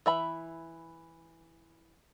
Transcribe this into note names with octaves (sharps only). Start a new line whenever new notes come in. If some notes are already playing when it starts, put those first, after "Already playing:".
E3 E5 B5